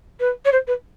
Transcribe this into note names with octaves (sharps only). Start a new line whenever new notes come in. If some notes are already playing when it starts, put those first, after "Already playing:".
B4
C#5
C5
B4